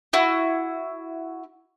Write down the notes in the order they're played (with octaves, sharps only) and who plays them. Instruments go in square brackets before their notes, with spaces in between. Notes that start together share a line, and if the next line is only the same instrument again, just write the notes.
[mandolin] E4 F#4